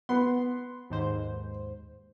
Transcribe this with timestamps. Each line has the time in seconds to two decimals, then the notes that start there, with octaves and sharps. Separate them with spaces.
0.09 B3 C6
0.90 D#2 G#2 C5